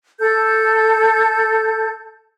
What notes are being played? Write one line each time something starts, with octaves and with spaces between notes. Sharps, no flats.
A4 G6